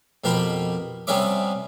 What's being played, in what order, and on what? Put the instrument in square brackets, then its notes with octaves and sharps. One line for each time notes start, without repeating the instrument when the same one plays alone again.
[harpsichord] F2 B2 G4 A#4 G5 B5
C3 G3 B3 C#4 E5 D6